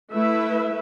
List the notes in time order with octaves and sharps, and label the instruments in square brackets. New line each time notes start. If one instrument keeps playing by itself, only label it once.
[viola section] A3 E4 B4 E5